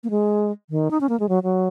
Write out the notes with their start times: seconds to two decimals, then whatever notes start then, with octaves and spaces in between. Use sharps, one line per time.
0.04 A#3
0.10 G#3
0.70 D#3
0.91 D#4
1.01 C#4
1.09 A#3
1.20 G#3
1.29 F#3
1.43 F#3